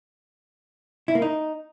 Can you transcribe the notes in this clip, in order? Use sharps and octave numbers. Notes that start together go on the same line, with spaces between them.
E4
A#3
D#4